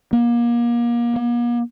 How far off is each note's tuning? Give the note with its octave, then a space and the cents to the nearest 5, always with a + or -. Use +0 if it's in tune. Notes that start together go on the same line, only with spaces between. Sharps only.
A#3 +30
A#3 +45